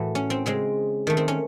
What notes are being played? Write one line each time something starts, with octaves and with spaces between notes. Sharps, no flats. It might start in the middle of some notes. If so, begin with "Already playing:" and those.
Already playing: A2 E3 A3 F#4
C#4
C4
C#3 G#3 C4
D#3 A3
C4
C#4